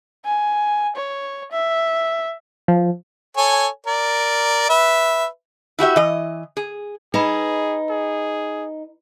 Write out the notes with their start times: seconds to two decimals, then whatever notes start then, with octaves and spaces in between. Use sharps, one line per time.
0.25 G#5
0.96 C#5
1.52 E5
2.68 F3
3.37 A4 C#5 G#5
3.87 A#4 D5
4.70 B4 E5
5.79 E4 F#4 G4 E5
5.96 E3 D#5
6.57 G#4
7.14 D#4 G#4 B4 D#5 B5
7.90 G#4